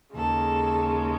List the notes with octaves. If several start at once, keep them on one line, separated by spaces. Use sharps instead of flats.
D#2 C#3 G#3 A4